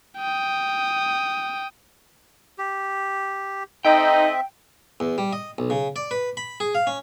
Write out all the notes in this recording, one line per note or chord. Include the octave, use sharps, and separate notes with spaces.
G5 D#6
G4
C4 D#4 A4 C5 D#5 E5 G5
E2
G3
D#5
B1
C#3
D5
B4
B5
G#4
F5
C#4